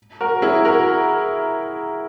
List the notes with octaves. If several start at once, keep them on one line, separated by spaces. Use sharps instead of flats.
F#4 A#4
E4 G#4
F#4 A#4